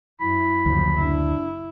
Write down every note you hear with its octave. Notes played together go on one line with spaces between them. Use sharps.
F#2 E4 B5
F#1 D2 F3
D4 E4